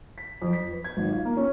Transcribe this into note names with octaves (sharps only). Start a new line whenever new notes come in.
B6
F2
B6
B4
G#6
G#1
F4
A#3
C#4